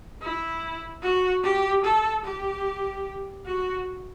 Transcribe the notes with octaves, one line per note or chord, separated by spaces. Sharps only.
E4
F#4
G4
A4
G4
F#4